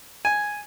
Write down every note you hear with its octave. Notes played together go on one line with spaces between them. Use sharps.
G#5